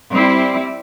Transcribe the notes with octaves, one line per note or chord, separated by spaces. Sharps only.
G3 C4 E4